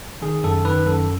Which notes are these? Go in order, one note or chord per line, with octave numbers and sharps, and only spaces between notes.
D#3 G#4
F#2 A4
D#3 B4
F#2 A4